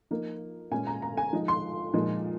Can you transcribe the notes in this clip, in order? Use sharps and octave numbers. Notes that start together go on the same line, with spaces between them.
F3 A#3 D#4
A#2 G#3 C#4 G#5
A#5
A#5
G#5
F3 G#3 D#4
C6
A#2 F3 G#3 D#4